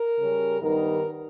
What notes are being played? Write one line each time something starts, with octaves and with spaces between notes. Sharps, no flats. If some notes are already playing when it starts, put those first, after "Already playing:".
Already playing: A#4
C#3 G3 C#4
G2 D#3 G3 B3 D#4 A#4